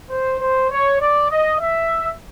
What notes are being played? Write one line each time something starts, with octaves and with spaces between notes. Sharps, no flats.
C5
C5
C#5
D5
D#5
E5